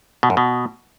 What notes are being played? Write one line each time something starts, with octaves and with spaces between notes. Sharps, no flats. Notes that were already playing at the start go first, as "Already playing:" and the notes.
B2
F#2
B2